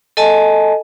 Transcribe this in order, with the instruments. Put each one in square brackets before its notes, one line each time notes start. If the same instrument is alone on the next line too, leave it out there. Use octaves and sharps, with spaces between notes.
[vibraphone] A4 D#5 G#5 A5